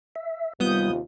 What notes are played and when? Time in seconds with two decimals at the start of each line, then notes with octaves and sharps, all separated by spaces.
0.16 E5
0.60 D#2 C3 G3 B3 F4 D#6 G6